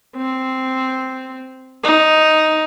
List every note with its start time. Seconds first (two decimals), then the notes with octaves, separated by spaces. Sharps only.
0.17 C4
1.83 D#4